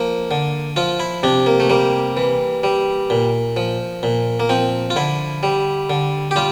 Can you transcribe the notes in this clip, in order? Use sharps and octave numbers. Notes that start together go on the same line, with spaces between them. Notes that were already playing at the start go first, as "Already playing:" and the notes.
Already playing: F3 A#3
D3
F3 F4
E4
C3 D4
A#3
A3
G3 A#3
E3
G3
A#2
F3
A#2
A#3
F3 C4
F4
D3 E4
G3
D3
G4
G3 F4